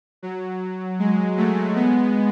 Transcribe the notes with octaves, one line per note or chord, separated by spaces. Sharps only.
F#3
G#3
F#3 A3
G#3 B3